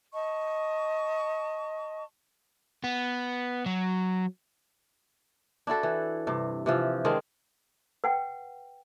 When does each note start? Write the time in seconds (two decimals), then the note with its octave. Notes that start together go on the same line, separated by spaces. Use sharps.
0.13 D#5 A5 C#6
2.84 B3
3.66 F#3
5.67 D4 E4 F#4 A4
5.83 E3
6.27 G2 C3
6.66 C3 E3 F3
7.05 D#3 G#3 C4 D4
8.04 B4 F#5 G5